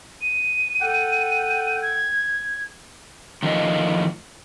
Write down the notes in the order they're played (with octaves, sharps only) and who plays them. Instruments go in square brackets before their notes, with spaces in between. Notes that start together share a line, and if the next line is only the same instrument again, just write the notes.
[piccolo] D#7
[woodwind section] A4 F#5 G5
[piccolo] G#6
[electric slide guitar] A2 D#3 F3 A3 A#3 D#5